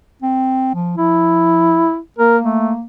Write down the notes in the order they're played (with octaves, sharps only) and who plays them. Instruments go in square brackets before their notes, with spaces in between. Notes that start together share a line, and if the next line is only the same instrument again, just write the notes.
[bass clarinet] C4
F3
[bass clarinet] F3 [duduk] E4
[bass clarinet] A#3 [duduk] A#4
[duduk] A3